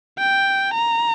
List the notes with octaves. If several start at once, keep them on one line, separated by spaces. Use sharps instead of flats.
G5
A#5